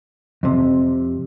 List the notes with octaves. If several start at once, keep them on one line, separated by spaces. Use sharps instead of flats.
F2 C3